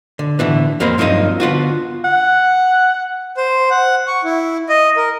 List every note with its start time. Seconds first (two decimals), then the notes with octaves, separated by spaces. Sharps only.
0.19 D3
0.39 A2 D3 E3 B3
0.80 F2 A#3 C4 C5 B5
0.98 G2 F3 F#3 C4 D#4
1.40 D3 B3 F4 F#4
2.04 F#5
3.37 C5
3.71 F#5
4.07 C#6
4.24 E4
4.69 D#5
4.97 A#4